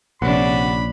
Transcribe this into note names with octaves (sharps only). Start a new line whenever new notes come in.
A#1 C3 C#4 D4 F#5 B5